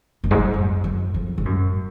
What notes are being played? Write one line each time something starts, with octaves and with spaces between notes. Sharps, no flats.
F#2
G#2
F#2
F#2
F#2
F2
G#2
F#2